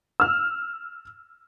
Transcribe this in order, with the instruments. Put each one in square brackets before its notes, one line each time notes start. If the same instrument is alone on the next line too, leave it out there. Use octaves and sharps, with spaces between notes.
[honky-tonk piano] E6 F6